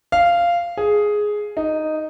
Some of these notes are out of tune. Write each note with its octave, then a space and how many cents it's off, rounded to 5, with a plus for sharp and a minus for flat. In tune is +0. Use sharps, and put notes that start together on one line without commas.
F5 -10
G#4 +5
D#4 -5